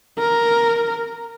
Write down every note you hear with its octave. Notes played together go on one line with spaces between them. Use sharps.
A#4